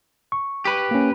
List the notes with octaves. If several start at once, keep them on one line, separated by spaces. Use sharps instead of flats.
C#6
G4 B4
A#3 C#4